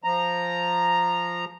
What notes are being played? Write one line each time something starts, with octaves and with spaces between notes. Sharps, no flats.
F3 A#5